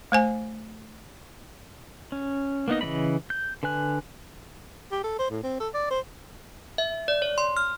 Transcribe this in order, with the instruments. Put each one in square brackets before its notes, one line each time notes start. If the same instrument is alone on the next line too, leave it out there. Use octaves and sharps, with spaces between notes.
[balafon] A3 C5 G#5
[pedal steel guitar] C#4
A#3 B3 D#4 D#5
C#3 E3 A#3 D#5 B5
G6
D3 B4 G#5 F#6
[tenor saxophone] G4
A4
C5
A2
C4
A4
D5
C5
[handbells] E5
D5
C#5
C6
F6